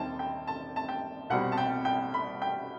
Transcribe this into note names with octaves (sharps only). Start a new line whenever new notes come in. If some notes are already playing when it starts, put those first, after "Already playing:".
Already playing: D#2 D#3 G3 C4 D#4 G5 A5
G5
A5
A5
G5
C2 B2 G3 C4 F#5
A5
G5
G5
B5
G5